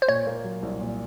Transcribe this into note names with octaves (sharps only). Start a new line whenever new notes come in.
C5
A#2 C#5
A#3
F#3
C2
A#2